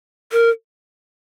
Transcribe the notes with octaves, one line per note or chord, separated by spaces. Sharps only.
A#4